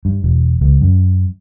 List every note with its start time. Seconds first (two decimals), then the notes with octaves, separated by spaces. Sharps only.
0.05 G2
0.24 E1
0.61 C#2
0.81 F#2